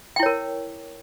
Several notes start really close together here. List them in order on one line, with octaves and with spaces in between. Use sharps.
G5 E4 C#5 A#4